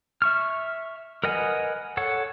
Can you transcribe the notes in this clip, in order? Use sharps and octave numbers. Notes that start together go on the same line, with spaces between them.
E5 C#6 F6
A#4 B4 D#5 F#5 G#5
A4 C#5 F#5